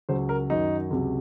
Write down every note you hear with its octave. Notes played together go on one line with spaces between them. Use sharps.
C#2 C#3 F#3 C5
A#4
F#2 D#3 F#3 D#4
C#2 C3 F#3